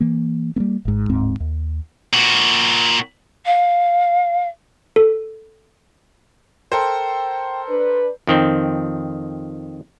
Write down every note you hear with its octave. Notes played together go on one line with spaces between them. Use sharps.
E3 A#3
G3 A#3 B3
G#1 G#2
D1 G#2 C4
D#2
A#2 F#4
F5
A4
A4 A#4 C5 G5
D4 B4
F2 D#3 C4